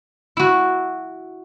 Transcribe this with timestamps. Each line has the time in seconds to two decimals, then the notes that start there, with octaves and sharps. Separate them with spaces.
0.37 E4 F#4